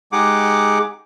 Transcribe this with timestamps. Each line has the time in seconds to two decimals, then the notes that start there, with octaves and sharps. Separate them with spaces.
0.12 G#3 D#4 G4 G#4 F#5 D6